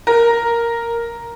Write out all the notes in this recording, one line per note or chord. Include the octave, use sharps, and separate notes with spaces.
A#4